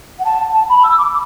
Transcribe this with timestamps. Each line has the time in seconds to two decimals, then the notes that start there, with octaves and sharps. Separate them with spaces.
0.18 F#5
0.24 A5
0.54 A5
0.69 B5
0.83 E6
0.97 D6